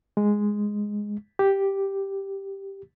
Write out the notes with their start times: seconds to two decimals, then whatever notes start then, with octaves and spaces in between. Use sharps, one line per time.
0.17 G#3
1.39 G4